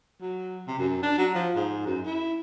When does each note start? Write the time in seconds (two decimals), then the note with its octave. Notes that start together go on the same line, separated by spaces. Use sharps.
0.21 F#3
0.68 C3
0.79 F#2
1.03 D4
1.18 F#3
1.34 F3
1.56 G#2
1.86 F#2
2.06 E4